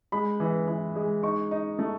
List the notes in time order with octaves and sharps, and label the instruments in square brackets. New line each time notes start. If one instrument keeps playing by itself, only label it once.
[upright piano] G#3 B5
E3
E3
G#3
D#4 C#6
D#4
A3